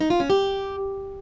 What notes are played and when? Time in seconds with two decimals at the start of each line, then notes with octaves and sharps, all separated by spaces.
0.01 D#4
0.10 F4
0.20 C#4
0.30 G4